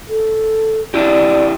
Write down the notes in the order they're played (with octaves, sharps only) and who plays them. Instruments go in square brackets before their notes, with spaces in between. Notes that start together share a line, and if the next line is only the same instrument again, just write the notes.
[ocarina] A4
[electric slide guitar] D4 E4 G4 [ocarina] D5